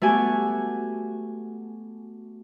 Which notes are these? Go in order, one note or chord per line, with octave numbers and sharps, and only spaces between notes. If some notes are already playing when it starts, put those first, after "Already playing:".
A3 B3 F#4 G4 G#5